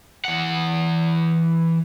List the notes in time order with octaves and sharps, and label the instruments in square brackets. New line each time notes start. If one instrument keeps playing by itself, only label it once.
[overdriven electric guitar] E3 F#5